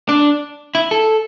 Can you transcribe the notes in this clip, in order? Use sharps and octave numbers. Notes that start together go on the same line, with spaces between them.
D4
E4
A4